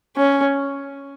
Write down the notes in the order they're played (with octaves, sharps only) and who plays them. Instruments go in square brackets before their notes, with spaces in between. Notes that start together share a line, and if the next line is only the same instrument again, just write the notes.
[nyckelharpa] C#4